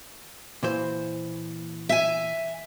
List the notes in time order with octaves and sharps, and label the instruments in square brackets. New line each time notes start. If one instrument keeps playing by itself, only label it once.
[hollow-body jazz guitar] A#2 E3 C5
[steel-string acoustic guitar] E5 G#5